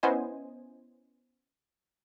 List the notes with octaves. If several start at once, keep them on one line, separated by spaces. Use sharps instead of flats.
B3 C#4 E4 C5 D#5 G#5